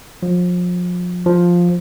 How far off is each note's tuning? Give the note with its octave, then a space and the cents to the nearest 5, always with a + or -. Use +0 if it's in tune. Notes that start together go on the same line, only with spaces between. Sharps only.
F3 +30
F3 +5